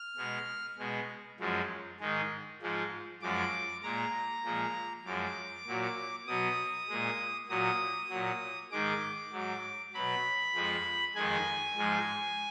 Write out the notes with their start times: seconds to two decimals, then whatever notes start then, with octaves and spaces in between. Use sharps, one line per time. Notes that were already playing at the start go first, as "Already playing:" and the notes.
Already playing: F6
0.17 B2 G#3
0.78 B2 G#3
1.40 F#2 F3 G#3
2.00 G#2 D#3 G#3
2.62 G#2 F3 G#3
3.22 F#2 F3 G#3 D6
3.83 A#2 G#3 A#5
4.44 A#2 F3 G#3
5.05 F#2 F3 G#3 D6
5.67 A#2 F#3
6.27 B2 F#3 D#6
6.89 A#2 G#3
7.49 A#2 F#3 D#6
8.10 A#2 F#3
8.71 G#2 D#3 G#3 D6
9.33 G#2 F#3
9.94 B2 F#3 B5
10.55 F2 F3 G#3
11.15 F2 D#3 G#3 G#5
11.77 G#2 F3 G#3